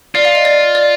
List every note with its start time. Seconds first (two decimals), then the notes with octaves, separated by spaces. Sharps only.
0.15 F4 D5
0.25 F5
0.35 D#5
0.45 D5
0.75 D5